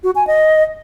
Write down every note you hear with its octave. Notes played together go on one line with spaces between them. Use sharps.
F#4
G#5
D#5